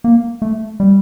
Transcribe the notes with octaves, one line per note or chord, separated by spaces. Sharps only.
A#3
A3
G3